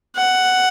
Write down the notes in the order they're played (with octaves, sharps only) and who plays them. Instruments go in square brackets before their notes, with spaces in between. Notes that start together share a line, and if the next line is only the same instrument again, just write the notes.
[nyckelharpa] F#5